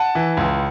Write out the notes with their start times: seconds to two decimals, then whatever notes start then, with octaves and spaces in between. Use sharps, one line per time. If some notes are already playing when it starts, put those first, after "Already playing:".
Already playing: F#5 A5
0.15 E3
0.37 C#2